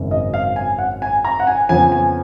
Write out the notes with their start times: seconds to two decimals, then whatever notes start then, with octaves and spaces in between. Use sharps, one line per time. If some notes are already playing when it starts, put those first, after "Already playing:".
Already playing: G#1 F#2 C#3
0.11 D#5
0.34 F5
0.56 G#5
0.78 F#5
1.02 G#5
1.25 A#5
1.40 F#5
1.47 G#5
1.69 F2 C#3 F3 B3 G#5
1.92 G#5